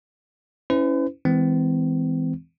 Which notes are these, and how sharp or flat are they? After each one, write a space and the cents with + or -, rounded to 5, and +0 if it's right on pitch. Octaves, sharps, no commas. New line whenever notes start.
C#4 +0 E4 -15 B4 +45
E3 -20 G#3 -5 C4 -40